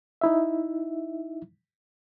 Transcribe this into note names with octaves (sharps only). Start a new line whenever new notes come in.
D#4 E4 E5